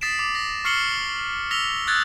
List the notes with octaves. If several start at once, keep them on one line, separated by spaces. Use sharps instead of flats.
D#6 A6 B6 C7 D7 E7
D6
A#6
C#6 F6 C7 C#7 F#7 G7
E6 A#6 B6 F7 G7
D#6 E6 F#6 G#6 A6